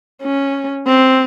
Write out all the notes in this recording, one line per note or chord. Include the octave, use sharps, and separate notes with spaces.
C#4
C4